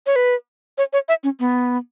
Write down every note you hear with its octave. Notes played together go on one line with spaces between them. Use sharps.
C#5
B4
C#5
C#5
E5
C#4
B3